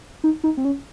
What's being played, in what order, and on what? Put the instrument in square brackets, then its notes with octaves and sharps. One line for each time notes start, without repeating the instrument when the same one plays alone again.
[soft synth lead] D#4
D#4
C4
C#4